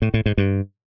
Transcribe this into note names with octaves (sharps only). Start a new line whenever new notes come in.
A2
A2
G#2
G2